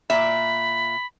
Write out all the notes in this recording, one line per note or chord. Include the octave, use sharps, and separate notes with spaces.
A#2 E5 B5